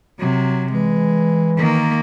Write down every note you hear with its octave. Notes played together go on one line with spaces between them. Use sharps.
C3 F#3
E3 G#3
D#3 A#3